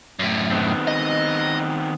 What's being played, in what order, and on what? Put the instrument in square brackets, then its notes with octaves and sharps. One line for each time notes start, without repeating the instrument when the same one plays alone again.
[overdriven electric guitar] F#2 A2
[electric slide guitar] D#3 B3 C4
[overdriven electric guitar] D#5